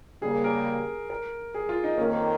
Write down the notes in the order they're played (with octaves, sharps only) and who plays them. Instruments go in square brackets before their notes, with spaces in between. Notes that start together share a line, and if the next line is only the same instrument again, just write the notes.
[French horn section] C#3 G3 A#3 [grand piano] G#4
[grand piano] A#4
A#4
G#4
F4
D#4
[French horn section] F2 D#3 A#3 [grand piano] C#4